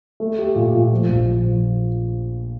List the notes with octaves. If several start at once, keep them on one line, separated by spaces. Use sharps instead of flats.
A3
G4
A#2
A#2
F3
A#1
F3
F3